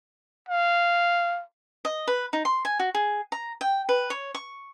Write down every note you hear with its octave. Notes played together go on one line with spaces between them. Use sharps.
F5
D#5
B4
D#4
C6
G#5
F#4
G#4
A#5
G5
B4
C#5
C#6